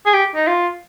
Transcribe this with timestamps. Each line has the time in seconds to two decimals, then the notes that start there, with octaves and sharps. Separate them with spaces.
0.06 G#4
0.14 G4
0.35 D#4
0.47 F4